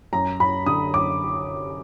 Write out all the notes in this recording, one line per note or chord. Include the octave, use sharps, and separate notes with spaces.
F#2 A#5
F#2 B5
D3 D#6
F#2 D6